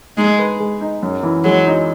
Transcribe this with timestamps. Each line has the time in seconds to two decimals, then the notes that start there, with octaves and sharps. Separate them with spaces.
0.17 G#3 D#4
0.39 B4
0.60 G#3
0.81 D#4
1.03 F#2
1.23 E3
1.44 F#3 G#3
1.66 D#4